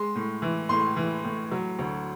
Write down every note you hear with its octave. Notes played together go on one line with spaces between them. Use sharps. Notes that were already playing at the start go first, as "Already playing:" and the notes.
Already playing: G#3 C6
A2
E3
A2 C6
E3
A2
F#3
D2